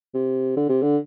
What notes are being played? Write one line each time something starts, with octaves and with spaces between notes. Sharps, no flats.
C3
D3
C3
D3